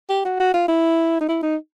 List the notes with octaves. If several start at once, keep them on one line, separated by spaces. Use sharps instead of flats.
G4
F#4
F#4
F4
E4
D#4
E4
D#4